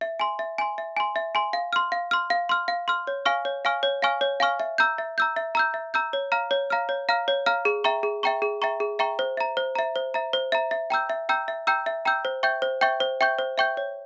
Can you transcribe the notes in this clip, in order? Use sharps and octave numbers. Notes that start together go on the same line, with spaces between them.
E5
G#5 C6
E5
G#5 C6
E5
G#5 C6
E5
G#5 C6
F5
C6 F6
F5
C6 F6
F5
C6 F6
F5
C6 F6
C#5
F5 G#5 C#6 F6
C#5
F5 G#5 C#6 F6
C#5
F5 G#5 C#6 F6
C#5
F5 G#5 C#6 F6
E5
A#5 E6 G6
E5
A#5 E6 G6
E5
A#5 E6 G6
E5
A#5 E6 G6
C#5
F5 A#5 F6
C#5
F5 A#5 F6
C#5
F5 A#5 F6
C#5
F5 A#5 F6
G#4
E5 G5 A#5 C#6
G#4
E5 G5 A#5 C#6
G#4
E5 G5 A#5 C#6
G#4
E5 G5 A#5 C#6
C5
E5 A#5
C5
E5 A#5
C5
E5 A#5
C5
E5 A#5
E5
G5 A#5 E6 G6
E5
G5 A#5 E6 G6
E5
G5 A#5 E6 G6
E5
G5 A#5 E6 G6
C5
E5 G5 C#6 G6
C5
E5 G5 C#6 G6
C5
E5 G5 C#6 G6
C5
E5 G5 C#6 G6
C#5